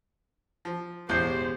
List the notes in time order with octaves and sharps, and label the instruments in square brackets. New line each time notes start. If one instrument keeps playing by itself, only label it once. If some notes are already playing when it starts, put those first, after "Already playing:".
[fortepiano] F3
[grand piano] E1 G6 C7 [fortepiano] A1 [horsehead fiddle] G4 C5